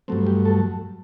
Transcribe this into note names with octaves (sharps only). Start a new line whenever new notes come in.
G2 F#3 A3 C4
G4
A4